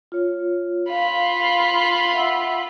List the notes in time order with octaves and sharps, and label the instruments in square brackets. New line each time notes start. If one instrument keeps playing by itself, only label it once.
[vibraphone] F4 C#5
[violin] F4 B5 [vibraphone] F5
[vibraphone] E5 F#5 E6